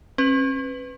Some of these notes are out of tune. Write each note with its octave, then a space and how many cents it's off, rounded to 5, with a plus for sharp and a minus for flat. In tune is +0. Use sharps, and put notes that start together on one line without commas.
C#4 -45 B4 +15